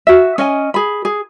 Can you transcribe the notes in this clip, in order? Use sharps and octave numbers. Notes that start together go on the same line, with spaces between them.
F#4 E5
C#4 D#5 G#5
G#4 B5
G#4